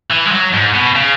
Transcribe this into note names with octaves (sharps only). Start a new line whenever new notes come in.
E3
G#3
F#3
G#2
B2
C#3